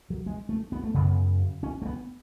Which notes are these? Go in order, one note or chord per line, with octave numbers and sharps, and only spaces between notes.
F#3
G#3
A3
B3
A3
F#2 C#3 B3
C#4
A3
B3